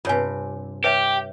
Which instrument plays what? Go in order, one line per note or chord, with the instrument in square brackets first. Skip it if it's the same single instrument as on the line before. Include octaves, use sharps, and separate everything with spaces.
[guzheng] G2 C3 [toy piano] F4 C#5 G#5
[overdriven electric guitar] G4 [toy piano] B4 C#5 E5